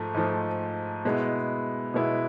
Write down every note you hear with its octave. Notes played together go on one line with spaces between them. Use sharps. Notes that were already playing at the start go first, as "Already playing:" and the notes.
Already playing: G#2 F3 A3
G#2 F3 A3
B2 G#3 B3 E4
B2 G#3 B3 E4